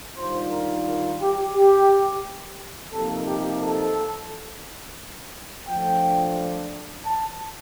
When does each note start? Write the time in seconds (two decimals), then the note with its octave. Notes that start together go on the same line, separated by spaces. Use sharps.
0.17 D#3 G3 D4 F4 C5
0.51 A#4
0.85 A#4
1.20 G4
1.55 G4
2.92 C3 F3 A#3 D#4 A4
3.27 G4
3.61 A4
5.68 F3 A3 D4 F4 G5
7.06 A5